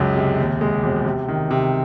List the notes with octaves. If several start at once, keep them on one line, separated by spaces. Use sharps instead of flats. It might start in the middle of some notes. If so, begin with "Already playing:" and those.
Already playing: C#2 F#2 G#3
C3
D#2
G#3
E1
C3
D#3
C3